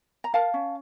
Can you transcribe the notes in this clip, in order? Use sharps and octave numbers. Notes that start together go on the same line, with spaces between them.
A#5
A#4 F5 A5
C#4